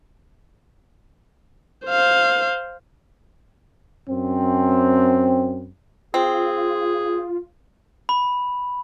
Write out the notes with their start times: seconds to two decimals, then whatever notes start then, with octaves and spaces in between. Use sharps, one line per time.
1.86 C5 F5
4.09 F#2 C4
6.14 C4 F4 G#4
8.09 B5